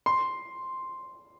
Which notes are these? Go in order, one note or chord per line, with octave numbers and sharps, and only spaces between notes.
C6